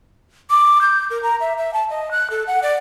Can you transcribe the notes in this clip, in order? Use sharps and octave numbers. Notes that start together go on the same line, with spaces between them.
D6
G6
A#4
A#5
E5
E5
A5
D#5
F#6
A4
F#5
D5